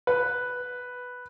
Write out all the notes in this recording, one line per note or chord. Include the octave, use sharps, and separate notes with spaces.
B4